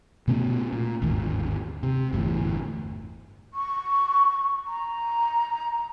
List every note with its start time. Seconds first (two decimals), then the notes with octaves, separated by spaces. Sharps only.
0.28 B2 A3 B3 C#4
0.73 A#2
1.02 G1 D#2 G#2
1.83 C3
2.13 G1 E2 A2
3.54 C#6
4.66 A#5